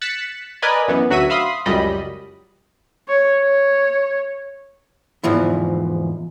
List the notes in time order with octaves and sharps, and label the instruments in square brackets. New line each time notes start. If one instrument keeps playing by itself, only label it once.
[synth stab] F#6 A6 B6 C#7 E7
A#4 B4 D5 D#5 G#5 B5
F#2 E3 B3
D2 F#3 F#4 E5 B6 D#7
E5 F5 B5 C6 D#6
C#2 F#2 G3 D#5 B5
[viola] C#5
C#5
[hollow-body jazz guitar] E2 G#2 E3 F3 E4